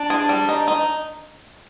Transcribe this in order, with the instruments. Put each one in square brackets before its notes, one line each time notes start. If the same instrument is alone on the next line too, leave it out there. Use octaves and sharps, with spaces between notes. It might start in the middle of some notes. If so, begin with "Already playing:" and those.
Already playing: [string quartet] D4
[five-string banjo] G#4
G3
D#4
D#4